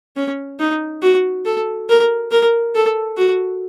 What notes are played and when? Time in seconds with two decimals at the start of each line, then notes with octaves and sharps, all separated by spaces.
0.16 C#4
0.59 D#4
1.03 F#4
1.45 A4
1.89 A#4
2.31 A#4
2.75 A4
3.17 F#4